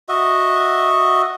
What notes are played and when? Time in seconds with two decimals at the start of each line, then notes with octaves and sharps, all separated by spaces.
0.09 F#4 D#5 E5